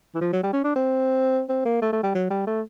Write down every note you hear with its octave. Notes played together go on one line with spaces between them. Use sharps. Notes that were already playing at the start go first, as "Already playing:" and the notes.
E3
F3
F#3
G3
C#4
D4
C4
C4
A#3
A3
A3
G3
F#3
G3
A3